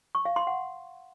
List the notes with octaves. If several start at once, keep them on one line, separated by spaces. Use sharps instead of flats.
C#6
F5
C6
F#5